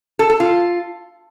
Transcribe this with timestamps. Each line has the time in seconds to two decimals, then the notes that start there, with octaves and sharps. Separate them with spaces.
0.19 A4
0.30 A4
0.40 F4